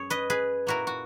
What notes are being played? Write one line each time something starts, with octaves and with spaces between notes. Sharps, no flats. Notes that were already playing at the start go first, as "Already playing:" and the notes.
Already playing: F#2 G#4 C#5
B4 D#5
G#4 B4
A#2 A#3 E4 F#4 A#4
F#4